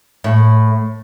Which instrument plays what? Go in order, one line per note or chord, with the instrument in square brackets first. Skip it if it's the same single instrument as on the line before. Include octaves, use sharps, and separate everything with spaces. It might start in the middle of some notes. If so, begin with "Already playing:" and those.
[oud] A2